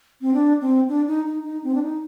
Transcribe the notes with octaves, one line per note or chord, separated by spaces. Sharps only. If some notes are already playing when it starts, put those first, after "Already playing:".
C4
D4
C4
D4
D#4
D#4
D#4
C4
D4
D#4